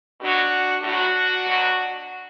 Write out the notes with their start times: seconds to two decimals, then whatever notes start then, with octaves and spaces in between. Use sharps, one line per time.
0.20 B2 F#3 D4 F#4
0.83 A2 F#3 D4 F#4
1.46 B2 F#3